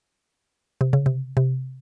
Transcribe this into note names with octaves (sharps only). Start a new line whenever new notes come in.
C3
C#3
C3
C3